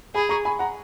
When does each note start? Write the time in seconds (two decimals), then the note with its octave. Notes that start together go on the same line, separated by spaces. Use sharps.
0.15 G#4 G#5 B5
0.29 A#5 C#6
0.45 G#5 B5
0.59 F#5 A#5